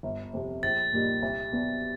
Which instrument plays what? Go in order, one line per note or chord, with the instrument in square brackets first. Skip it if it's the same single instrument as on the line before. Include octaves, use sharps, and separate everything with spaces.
[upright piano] G1
F2 C3
[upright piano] A#1 [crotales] A6
[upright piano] A#2 G3 A#3 D#4
C2
B2 F#3 B3 D4